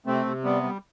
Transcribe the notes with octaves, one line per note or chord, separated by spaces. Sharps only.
C3 A3 C4
C3
G3 B3
G3